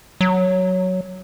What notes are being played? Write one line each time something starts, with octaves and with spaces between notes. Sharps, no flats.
F#3